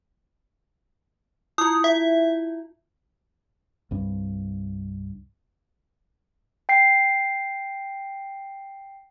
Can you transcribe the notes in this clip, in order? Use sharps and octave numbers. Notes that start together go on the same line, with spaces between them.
E4 F4 D#6
E5
C2 G2
G5 C7